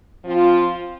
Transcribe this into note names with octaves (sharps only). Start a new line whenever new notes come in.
F3 C4 F4